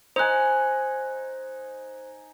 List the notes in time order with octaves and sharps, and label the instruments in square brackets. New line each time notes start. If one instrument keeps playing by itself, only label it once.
[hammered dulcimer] D#4 G#5 [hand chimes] C5 F#6